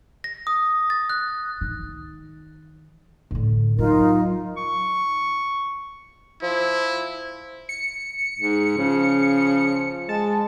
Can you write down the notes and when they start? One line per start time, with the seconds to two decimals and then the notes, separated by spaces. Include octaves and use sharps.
0.24 A#6
0.47 D#6
0.90 A6
1.10 F#6
1.61 D#3
3.31 A2 D3
3.79 F#3 D#4 F4 A#4
4.57 C#6
6.42 F3 E4
7.69 C#7
8.39 G#2
8.77 C#3 F3
10.09 G#3 A5